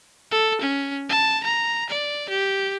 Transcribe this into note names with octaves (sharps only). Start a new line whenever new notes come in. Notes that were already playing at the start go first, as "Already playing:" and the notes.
A4
C#4
A5
A#5
D5
G4